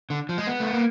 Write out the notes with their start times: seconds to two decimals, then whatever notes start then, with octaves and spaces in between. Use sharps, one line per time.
0.10 D3
0.29 F3
0.38 G#3
0.47 B3
0.60 A3
0.73 A#3